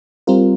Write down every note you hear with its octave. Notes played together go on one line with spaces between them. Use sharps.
G3 C4 F4 A#4